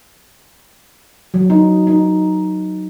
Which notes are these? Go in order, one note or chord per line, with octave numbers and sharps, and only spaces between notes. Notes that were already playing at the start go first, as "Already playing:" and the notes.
F#3
D#4
D#4